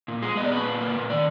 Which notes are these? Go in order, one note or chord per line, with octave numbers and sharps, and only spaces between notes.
A#2
G#3 G#4
B3 D#5
D5
A#2 B4
A#2
A#3
A#2
D#3 D5